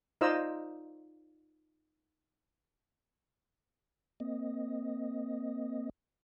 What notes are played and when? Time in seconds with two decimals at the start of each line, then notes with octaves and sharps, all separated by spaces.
0.21 D#4 F4 C5 D5 D#5 E6
4.20 A#3 C4 D#5